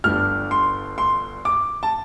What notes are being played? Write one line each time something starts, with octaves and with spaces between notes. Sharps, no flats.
G1 G2 G3 D4 F6
C6
C6
D6
A5